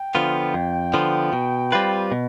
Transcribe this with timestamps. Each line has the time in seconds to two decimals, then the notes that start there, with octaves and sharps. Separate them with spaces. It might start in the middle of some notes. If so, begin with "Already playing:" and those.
Already playing: G5
0.15 D3 F3 B3 F4
0.54 F2
0.94 D3 F3 B3 F4
1.33 B2
1.72 G3 C4 F4 B4
2.12 B2